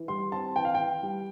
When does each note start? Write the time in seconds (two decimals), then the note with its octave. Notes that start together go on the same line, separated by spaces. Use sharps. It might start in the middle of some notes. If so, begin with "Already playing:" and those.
Already playing: E3
0.08 G3 C6
0.32 C4 A5
0.56 E3 G5
0.65 F5
0.75 E3 G5
1.03 G3